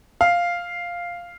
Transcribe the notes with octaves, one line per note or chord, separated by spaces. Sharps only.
F5